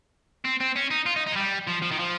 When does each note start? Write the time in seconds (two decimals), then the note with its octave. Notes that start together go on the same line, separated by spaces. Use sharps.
0.45 C4
0.61 C4
0.76 C#4
0.91 D#4
1.06 F4
1.16 D#4
1.27 D#4
1.32 G#3
1.36 G3
1.67 F3
1.82 F3
1.91 D#3
1.99 F3